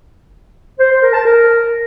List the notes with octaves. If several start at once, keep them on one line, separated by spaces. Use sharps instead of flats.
C5
C5
A#4
A5
A#4